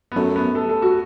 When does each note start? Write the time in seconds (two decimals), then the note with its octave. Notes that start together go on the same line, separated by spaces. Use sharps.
0.12 B3
0.16 F#2 A3
0.36 B3
0.55 A4
0.69 A4
0.82 F#4